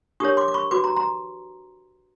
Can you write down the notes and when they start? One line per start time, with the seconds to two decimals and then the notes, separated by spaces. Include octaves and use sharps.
0.20 D4 G4 A#4 C#5 C#6 D#6
0.37 C6 D6
0.48 D6
0.54 B5 C#6
0.71 F#4 B4 C6 D6
0.84 A#5 C6
0.96 A#5 C6